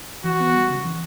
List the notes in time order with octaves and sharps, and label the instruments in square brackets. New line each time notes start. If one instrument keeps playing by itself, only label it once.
[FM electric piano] E3 [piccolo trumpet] F#4
[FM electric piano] B3
G3
C#3
E3